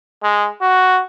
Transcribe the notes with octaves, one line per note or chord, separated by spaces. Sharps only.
G#3
F#4